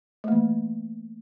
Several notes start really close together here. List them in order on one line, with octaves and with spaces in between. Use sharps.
A3 A#3 E3